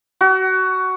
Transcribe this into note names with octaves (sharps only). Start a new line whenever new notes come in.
F#4